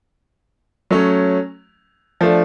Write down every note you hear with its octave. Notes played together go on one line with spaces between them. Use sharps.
F#3 A3 C#4
F3 A3 D4